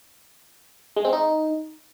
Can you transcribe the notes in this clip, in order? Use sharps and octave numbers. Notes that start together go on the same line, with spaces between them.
G#3
C4
D#4